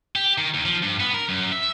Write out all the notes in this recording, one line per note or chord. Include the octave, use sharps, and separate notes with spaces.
G4
D#3
D#2
F3
G2
B3
A#4
F#2
E5